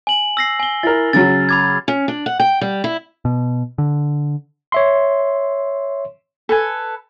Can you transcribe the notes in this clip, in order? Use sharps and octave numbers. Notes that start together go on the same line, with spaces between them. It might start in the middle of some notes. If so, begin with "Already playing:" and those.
G#5 F#7
E6 A#6 C7
G#5 G7
E4 A#4 A6
C#3 F#3 A6
B5 D6 G#6
C#4
D4
F#5
G5
G3
E4
B2
D3
C#5 E5 C6
A4 B4 G#5